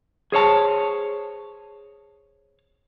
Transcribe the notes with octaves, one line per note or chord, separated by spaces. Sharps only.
G#4 C5 C#5 A5